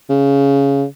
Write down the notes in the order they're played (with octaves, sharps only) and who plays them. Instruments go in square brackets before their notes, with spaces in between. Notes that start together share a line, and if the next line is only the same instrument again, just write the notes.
[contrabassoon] C#3